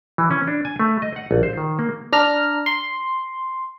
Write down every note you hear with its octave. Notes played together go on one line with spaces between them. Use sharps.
E3
C#4
D4
G#5
A3
D#5
F#5
A#1
C5
D#3
A#3
D4 A#5 F6
C6